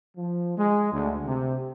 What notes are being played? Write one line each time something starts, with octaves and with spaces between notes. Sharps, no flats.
F3
G#3
D2
C3